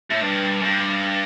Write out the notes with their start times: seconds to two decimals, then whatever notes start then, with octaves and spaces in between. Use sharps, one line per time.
0.10 A2
0.21 G2
0.60 F#2
0.64 G2